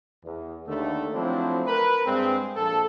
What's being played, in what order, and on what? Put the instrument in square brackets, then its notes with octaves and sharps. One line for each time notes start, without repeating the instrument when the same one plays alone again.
[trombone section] E2
D#2 D3 A3
F3 F#3 A3 C4 D4 E4
A#4 B4
G2 G#3 C4
A#1 A4